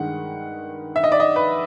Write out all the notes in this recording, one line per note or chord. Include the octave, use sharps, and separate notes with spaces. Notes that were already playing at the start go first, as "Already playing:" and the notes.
Already playing: G2 D#3 G#3 F#5
E5
D#5
D5
D#5
B4